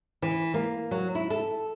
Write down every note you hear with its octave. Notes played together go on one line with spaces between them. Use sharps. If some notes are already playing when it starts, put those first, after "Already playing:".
E3
A#3
F#3
E4
A4